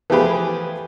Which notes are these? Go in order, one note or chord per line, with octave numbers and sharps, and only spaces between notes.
E3 F3 A3 G4 G#4 B4